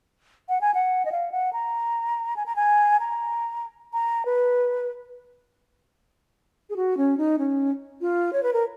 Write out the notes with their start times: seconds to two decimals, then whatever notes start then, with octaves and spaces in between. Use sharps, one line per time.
0.49 F#5
0.61 G#5
0.74 F#5
1.05 D#5
1.12 F5
1.32 F#5
1.53 A#5
2.36 G#5
2.46 A#5
2.56 G#5
3.00 A#5
3.93 A#5
4.25 B4
6.70 G#4
6.76 F#4
6.97 C#4
7.17 D#4
7.38 C#4
8.01 F4
8.33 C#5
8.43 B4
8.53 A#4